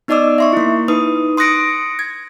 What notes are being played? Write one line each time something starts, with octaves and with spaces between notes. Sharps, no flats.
B3 D#4 D5 D#5 D6 E6
E5 C6 C#6
A#3 E4
D#4 B4 D#6
C6 D#6 F#6 A#6 C#7 D7
G#6